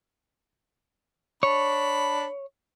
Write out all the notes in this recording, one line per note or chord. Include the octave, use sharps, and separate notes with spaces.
D4 C#5 B5